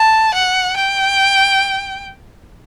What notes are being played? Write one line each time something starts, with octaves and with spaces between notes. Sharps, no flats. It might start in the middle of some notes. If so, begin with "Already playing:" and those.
Already playing: A5
F#5
G5